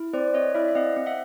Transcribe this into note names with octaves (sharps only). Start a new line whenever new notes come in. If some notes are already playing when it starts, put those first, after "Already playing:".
Already playing: E4
C4 C5 D5
C4 C#5 D#5
E4 D5 E5
E5
C4 D#5 F5
C4
E5 F#5